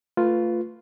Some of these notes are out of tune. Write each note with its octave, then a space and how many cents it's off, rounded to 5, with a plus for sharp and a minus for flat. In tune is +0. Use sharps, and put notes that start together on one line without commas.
A3 +25 F4 +0 B4 +10